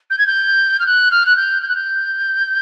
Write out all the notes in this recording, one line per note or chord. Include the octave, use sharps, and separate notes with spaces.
G6
G#6
G6
F6
F#6
F6
F#6
G6
G6
F#6
G6